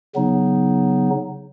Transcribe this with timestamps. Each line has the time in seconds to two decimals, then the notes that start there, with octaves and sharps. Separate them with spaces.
0.15 C#3 F#3 B3 D#4